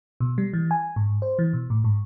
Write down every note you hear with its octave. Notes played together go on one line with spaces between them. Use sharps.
B2
G3
E3
G#5
G#2
C5
E3
B2
A2
G#2